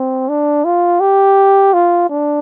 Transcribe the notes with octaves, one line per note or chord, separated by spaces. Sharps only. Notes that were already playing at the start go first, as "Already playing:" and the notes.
Already playing: C4
D4
F4
G4
F4
D4